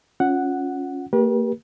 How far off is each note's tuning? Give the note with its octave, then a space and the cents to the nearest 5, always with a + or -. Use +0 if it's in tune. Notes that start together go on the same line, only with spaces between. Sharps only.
C#4 +0 F4 +20 F#5 +0
A#3 -35 G4 +5 B4 -45